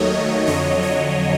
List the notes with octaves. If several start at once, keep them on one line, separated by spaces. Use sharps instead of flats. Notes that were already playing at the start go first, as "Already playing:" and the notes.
Already playing: D#2 D#3 F#3 A3 C#5 D#5
F2 D3 F#3 C#5 D#5
C#5 D#5